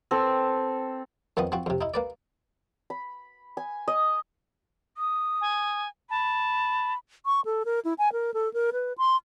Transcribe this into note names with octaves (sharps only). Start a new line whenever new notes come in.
C4 A4
F2 D#3 F3 B3 D#6
F3 C4 F#4
F2 C3
D#4 E4
A#3 B4 D5
B5
G#5
D#5
D#6
G#5
A5 B5
C#6
A4
A#4
E4
G#5
A#4
A4
A#4
B4
C6